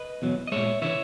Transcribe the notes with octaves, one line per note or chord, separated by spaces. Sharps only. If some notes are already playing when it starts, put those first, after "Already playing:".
Already playing: B4 D#5
E2 B2 F#3
D#5
A#2 G#3 C#5 E5
C#3 E3 C#5 E5